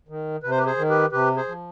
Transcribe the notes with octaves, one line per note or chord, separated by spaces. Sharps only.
D#3
C3 B4
C5
G4 B4
G#4 C5
D#3
G4 B4
C3 G4 B4
G#4 C5
F3